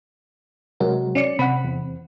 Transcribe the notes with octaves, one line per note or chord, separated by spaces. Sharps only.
C3 F#3 G#3 A#4
C#4 D5 C#7
C3 C4 F#5 B5
E2